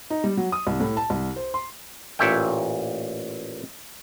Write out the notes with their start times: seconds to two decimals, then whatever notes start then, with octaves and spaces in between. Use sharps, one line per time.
0.10 D#4
0.24 G3
0.37 F#3
0.52 D#6
0.67 C2
0.80 A2
0.97 A5
1.10 C2
1.36 C5
1.54 C6
2.19 A1 A#2 C#5 E5 G5